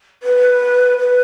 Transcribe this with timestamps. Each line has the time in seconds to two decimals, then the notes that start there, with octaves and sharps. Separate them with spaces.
0.23 B4
0.98 B4